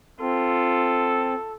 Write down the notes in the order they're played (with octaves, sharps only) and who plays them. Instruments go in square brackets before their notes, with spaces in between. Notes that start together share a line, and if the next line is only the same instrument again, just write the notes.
[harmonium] C4 [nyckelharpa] F4 [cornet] A4